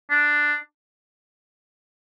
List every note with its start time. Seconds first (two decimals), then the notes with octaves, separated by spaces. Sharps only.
0.11 D4